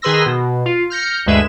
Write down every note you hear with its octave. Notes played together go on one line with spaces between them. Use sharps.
D#3 G#4 B4 C6 E6 A#6
B2
F4
F6 G6 A#6 C#7
D2 G2 G#3 B4 E5 E7